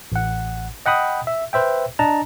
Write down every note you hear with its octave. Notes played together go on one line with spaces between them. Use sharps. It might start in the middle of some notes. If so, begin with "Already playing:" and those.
A1 F#5
D#5 F#5 G5 B5 D#6
E5
B4 C5 E5 G5
D4 D#5 A5 A#5